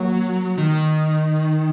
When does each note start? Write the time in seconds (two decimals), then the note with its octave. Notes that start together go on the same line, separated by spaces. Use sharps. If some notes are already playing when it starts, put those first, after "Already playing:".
Already playing: F#3 A#3 F#4 C#5
0.58 D#3